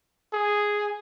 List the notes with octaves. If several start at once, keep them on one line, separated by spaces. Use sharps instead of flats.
G#4